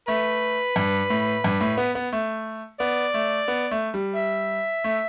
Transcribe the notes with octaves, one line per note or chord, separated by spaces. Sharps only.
A3 B4
G2
A2
G2
A2
B3
B3
A3
B3 D5
A3
B3
A3
G3
E5
A3